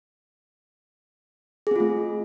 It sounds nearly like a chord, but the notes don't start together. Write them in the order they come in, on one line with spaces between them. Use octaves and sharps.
G#4 C4 F4 A3